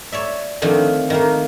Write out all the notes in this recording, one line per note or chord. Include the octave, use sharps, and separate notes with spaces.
C#5 D5 E5
D3 D#3 F3 A3 C4
D#3 A3 A#3